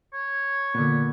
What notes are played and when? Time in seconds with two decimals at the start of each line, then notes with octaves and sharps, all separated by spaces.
0.13 C#5
0.74 A#2 D3 B3